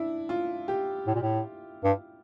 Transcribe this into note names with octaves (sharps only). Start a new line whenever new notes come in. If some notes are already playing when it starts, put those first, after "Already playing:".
Already playing: D4 E4
F4
G4
A2
A#2
A2
G2